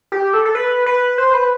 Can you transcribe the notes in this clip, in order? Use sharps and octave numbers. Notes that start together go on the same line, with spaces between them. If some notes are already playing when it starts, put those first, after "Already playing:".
G4
A4
A4
B4
B4
C5
B4